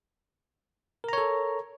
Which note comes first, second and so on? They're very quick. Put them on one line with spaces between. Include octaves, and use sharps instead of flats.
A#4 A#5 C#5 A4